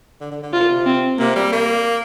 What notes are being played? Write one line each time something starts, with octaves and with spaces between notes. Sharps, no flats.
D3
D3
D3
C3 F4
A#2
C3
C4
C3 A#3
G3
A#3